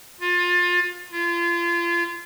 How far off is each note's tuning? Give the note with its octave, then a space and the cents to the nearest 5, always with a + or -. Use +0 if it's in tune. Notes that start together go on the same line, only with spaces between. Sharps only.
F4 +25
F4 -30